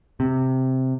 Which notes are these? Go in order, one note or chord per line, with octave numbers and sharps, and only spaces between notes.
C3